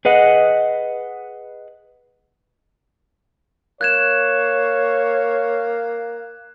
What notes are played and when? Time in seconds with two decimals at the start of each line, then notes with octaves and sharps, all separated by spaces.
0.05 G#4 B4 D#5 F#5
3.81 A#3 C#5 F#6 G#6 E7